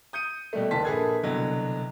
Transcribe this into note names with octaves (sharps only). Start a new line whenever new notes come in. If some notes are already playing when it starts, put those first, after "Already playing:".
D#6 G6 C#7 D#7
B2 G3 A3
F#1 D#2 A5 C6 B6
A#1 A#3 G#4 A4 B4 G#6
C2 B2 D3 F#3